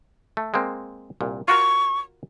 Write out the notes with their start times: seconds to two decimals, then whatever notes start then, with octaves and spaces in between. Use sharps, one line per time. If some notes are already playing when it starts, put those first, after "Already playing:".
0.37 A3
0.54 G#3 A#3 C4
1.21 C2 A#2
1.48 F4 F#4 A#4 C#6